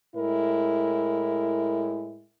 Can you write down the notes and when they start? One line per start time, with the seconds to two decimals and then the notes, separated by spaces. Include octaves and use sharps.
0.16 A2 G#3 E4 A#4